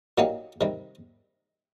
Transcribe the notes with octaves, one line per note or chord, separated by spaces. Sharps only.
A#2 F#3 A#3 D#4 G4
C3 D#3 G3